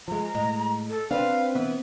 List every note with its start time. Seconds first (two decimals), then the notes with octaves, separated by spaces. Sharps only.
0.08 F3 G#3 A#5
0.35 A2 G#3
0.89 A4
1.11 C4 D4 B4 F5
1.55 E3 B3